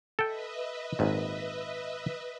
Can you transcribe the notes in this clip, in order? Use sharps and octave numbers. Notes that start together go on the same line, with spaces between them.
A4 B4 D#5 E5 G5
G#1 A#2